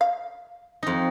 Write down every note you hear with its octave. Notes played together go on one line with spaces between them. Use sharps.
F5
F2 D#4